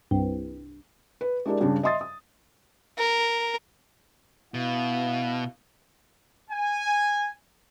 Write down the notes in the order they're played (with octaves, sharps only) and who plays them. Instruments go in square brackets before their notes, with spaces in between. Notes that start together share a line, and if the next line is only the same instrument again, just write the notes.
[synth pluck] C2 G2
[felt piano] B4
G#3 D4 E4 G4 A#4 D5
G2 C#3 G3 D4
D#5 E5 C6 D#6 A6
D#6
[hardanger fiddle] A#4
[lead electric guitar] B2 [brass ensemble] E4 F5
[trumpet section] G#5